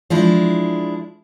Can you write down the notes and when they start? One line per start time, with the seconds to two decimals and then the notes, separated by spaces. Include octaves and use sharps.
0.10 F3 G#3 D4 E4